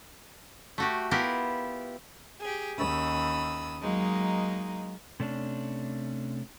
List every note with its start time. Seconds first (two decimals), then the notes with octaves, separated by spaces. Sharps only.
0.78 A3 F#4 G4
1.11 B3 E4 F4 G4 A#4
2.40 G4 G#4
2.77 D#2 C#4 B5 D#6 E6
3.82 F#3 G#3 A#3 D#4
5.20 C3 A3 C#4 D4